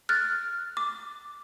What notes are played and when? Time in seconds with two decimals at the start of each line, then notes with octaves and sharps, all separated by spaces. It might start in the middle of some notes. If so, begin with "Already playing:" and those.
0.09 F6 F#6 A6
0.77 D6